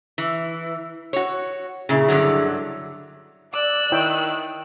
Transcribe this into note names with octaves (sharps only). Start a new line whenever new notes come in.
E3
F#4 C#5
A#2 C#3 E4 G#4 E5
G2 D3 F#3
D5 D6 E6 F#6
D#3 E4 C#5 G5